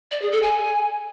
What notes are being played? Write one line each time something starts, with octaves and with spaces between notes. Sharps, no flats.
D5
G#4
A4
G#5